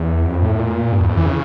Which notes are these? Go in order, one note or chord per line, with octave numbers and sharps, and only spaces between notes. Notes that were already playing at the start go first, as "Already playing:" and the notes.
Already playing: E2
F2
A2
A#2
G2
E2
F2
E3
C#3